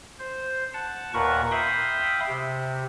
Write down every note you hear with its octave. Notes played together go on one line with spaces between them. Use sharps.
C5
F#5 A5
D#2 A#2 A#4 B4 F#5 C#6
E5 F5 G5 B5 C6 D#6
C3